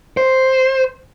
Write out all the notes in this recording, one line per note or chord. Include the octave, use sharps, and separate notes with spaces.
C5